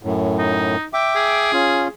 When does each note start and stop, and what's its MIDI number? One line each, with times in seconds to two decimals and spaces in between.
0.03 0.76 42
0.03 0.76 45
0.38 0.86 63
0.93 1.52 76
0.93 1.52 79
0.93 1.52 86
1.16 1.92 68
1.53 1.88 61
1.53 1.88 65